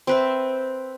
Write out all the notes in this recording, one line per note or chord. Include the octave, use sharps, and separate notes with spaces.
C4 B4 E5